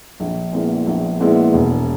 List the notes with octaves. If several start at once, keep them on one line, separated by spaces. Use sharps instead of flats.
A#1
A#2 G#3 B3 E4
A#1
A#2 G#3 B3 E4
E1